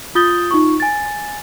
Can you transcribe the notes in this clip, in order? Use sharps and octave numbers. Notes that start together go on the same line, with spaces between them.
F4 D#6 G6 A6 G7
D#4 F4 C#6
G#5 A6